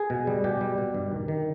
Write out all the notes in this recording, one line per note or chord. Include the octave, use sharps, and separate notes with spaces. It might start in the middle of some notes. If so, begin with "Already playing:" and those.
Already playing: G#4
B2
G3
B2 G4
G3
B2
G2
D#3
D#3